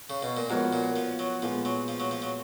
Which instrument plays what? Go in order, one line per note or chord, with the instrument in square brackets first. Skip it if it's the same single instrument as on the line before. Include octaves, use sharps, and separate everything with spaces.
[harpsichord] C#3
B2
A#2
[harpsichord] G#2 [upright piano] F3 B3 F#4 A#4 C#5
[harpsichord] A#2
F3
F#3
[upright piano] A#2 G#3 B3 [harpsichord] F3
[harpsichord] F#3
F3
F#3
F3
F#3